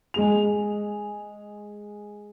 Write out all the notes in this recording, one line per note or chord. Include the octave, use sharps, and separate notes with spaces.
G#3 G#4 F7